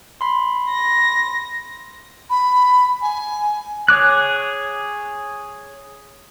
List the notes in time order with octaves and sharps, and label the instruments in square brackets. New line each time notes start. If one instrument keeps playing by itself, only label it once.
[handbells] B5 C6
[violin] A#6
[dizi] B5
G#5
[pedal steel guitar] G#4 C#5 D6 F#6